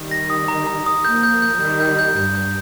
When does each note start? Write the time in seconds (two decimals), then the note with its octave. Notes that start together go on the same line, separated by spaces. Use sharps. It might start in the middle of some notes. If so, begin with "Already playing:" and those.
Already playing: D#3 G3
0.11 A#6
0.30 D#6
0.48 A#5
0.67 A#5
0.86 D#6
1.04 F3 A#3 G6
1.23 G6
1.42 G6
1.60 D#3 G3 G6
1.80 G6
1.99 G6
2.16 G2 G6
2.35 G6